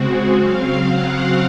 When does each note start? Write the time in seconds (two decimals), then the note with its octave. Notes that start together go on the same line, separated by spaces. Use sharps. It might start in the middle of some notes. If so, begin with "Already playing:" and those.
Already playing: C#3 G#3 C4 F#4
0.36 C#3 F#3 C4 F5
0.80 F#5